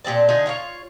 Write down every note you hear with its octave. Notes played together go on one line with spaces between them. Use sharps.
A#2 G#3 C4 A5
D3 D#4 F4 G#5
F4 C#5